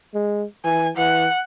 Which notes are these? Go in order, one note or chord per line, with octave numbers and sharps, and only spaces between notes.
G#3
E3 G#5
E3 F#5